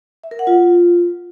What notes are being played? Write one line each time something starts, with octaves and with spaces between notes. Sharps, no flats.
E5
A#4
F#5
F4